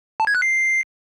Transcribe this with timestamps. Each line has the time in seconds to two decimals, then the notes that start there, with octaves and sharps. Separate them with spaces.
0.20 A5
0.27 G#6
0.35 F#6
0.42 C7